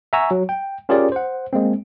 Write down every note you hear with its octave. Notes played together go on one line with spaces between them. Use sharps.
E5 F#5 G#5 A#5 C#6 E6
F#3
G5
C#4 F4 G4 G#4 A#4 D5
C5 F#5
G#3 A#3 C4